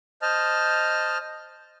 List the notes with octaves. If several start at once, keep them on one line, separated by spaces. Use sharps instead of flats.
C5 D#5 A5 F6